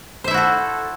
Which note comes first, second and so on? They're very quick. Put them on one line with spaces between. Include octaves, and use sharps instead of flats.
C5 E5 E4 F#4 A4